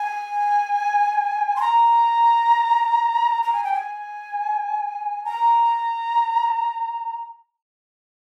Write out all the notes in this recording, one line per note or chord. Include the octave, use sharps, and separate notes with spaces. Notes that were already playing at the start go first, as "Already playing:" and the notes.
Already playing: G#5
C6
A#5
A#5
G#5
G5
G#5
A#5